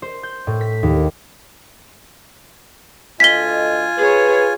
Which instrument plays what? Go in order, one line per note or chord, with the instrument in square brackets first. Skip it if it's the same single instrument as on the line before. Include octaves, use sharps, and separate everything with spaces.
[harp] C5
G6
A2
B6
D#2
[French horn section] D2 A4 D#5 [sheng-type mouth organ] F4 G#5 [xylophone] B6 G7
[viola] G#4 C#5 [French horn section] B4